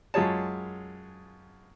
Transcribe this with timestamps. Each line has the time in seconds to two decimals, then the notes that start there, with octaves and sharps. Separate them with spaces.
0.14 F#2 G#3 F4 G#4 C#5 A5